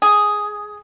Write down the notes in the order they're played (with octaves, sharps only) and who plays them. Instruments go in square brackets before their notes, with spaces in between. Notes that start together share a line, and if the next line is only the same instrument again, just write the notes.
[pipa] G#4